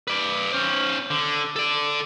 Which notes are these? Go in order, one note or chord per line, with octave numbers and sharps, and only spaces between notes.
B4 D5
C#4 C5
D3
A4 D5